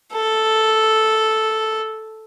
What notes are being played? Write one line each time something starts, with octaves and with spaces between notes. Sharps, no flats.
A4